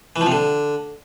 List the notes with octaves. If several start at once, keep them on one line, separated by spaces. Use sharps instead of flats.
E3
F3
C3
D3